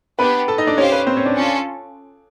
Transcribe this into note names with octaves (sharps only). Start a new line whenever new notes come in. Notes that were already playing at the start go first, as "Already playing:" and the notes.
B3 D4 G4 B4 B5
A4 A5
D#4 D#5
D4 D5
C#4 G4 C5 C#5 F5
B4
C4 C5
C#4 C#5
D4 D5
C#4 F4 A4